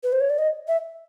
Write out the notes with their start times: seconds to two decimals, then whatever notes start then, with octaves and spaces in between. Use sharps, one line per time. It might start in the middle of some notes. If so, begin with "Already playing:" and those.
0.03 B4
0.12 C5
0.20 C#5
0.30 D5
0.38 D#5
0.68 E5